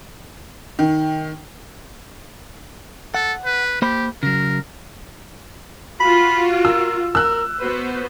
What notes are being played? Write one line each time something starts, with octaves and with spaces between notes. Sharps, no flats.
D#3
A4 F#5
B4
A#3 G4 C5 B5
C#3 F#3 A#4
F4 F#4 B5
A#4 E6
A#4 E6 F#6
B3 F#4 B4 C5